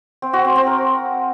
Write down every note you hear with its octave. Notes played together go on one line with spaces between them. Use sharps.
C4
F#4
C4
C4
A#4